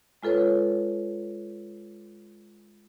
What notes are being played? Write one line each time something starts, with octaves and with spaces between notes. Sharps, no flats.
G#3 F4 A4 B4 C#5